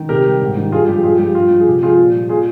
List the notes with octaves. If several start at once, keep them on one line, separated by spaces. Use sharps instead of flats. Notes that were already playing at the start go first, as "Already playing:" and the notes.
Already playing: D#3
C3 G4 A#4
G3
G#2
D#3
G2 F4 G#4
F3 G4
G2 F4 G#4
F3 G4
G2 F4
F3
G#4
C3 G4
F3 F4 G#4
A#2
G3
A#2 F4 G#4